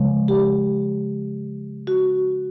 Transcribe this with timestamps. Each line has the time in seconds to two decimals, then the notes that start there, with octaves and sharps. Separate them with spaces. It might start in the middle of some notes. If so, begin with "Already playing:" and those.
Already playing: C#3 F3 G#3
0.28 G4
1.87 F#4